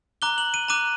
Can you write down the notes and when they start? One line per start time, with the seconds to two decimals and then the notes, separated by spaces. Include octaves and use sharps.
0.22 A#5 D6 F#6 G7
0.38 F#7
0.54 D#7
0.68 A#5 D6 F#6 D#7